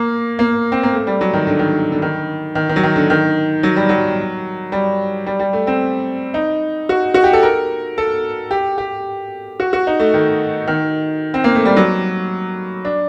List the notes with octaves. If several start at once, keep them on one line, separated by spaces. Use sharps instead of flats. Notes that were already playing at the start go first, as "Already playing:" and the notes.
Already playing: A#3
A#3
C4
A#3
A3
G3
F#3
D#3
D3
D#3
D3
D#3
D#3
D#3
F#3
D#3
D3
D#3
F#3
G3
F#3
G3
G3
G3
A3
C4
D#4
F#4
F#4
G4
A4
A#4
A4
G4
G4
F#4
F#4
D#4
A3
D#3
D#3
C4
A#3
A3
G3
F#3
D4